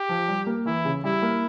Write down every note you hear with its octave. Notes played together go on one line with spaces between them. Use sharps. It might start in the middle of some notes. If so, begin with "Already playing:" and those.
Already playing: G4
F3
G3
A#3
E3 E4
C#3
G3 E4
A#3